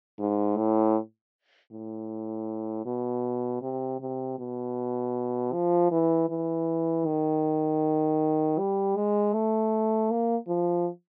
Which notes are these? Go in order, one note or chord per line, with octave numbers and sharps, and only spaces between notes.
G#2
A2
A2
B2
C3
C3
B2
F3
E3
E3
D#3
G3
G#3
A3
A#3
F3